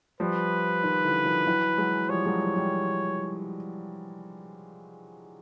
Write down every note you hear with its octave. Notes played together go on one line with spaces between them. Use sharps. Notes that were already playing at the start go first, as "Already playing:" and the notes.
F3 G3 B4
D#3 F3
D3 E3
D#3 F3
E3 F#3
F#3 G#3
F3 G3 C#5
F#3 G#3
F3 G3
F3 G3